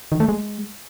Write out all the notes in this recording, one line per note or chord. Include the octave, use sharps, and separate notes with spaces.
D#3
A3
G#3